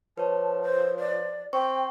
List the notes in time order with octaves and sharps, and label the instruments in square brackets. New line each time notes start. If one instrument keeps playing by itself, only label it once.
[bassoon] F3 [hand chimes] B4 C#5 [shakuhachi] A5
[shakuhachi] C5
D5
[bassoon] C4 [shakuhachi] G5 [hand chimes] C#6